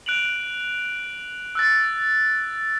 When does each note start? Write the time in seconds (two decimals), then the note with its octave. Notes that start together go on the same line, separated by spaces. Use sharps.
0.06 F#6 D7 F7 F#7
1.55 E6 F#6 A6